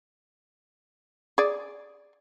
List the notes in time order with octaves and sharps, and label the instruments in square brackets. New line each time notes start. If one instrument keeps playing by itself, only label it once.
[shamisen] G#4 D5